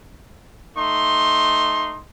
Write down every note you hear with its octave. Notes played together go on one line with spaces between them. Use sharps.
A3 D#4 C6